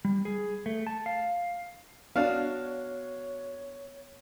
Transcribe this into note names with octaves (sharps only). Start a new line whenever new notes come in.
G3
G#4
A3
A5
F5
B3 D4 F#4 C#5 D#5 F5